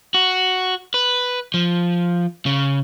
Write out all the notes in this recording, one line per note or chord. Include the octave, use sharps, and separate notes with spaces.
F#4
B4
F3
C#3